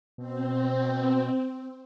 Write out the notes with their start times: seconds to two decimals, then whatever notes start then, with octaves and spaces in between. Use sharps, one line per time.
0.18 B2 C4